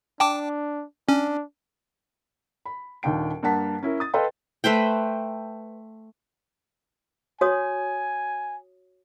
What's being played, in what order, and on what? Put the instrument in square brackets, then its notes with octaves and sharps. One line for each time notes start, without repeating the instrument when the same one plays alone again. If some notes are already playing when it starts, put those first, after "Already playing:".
[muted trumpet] D4 [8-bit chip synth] G5 A5 D6
[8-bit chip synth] C#4 [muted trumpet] D4
[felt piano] B5
D#1 D#2 D4 G5 D7
G2 A#3 F#5 A5 B6
C#4 E4 A#4
D#6 A6
A4 B4 D#5 F5 G5 C6
[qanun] A3 B4 C5 G5
[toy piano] F#4 C#5 D#6 [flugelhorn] G#5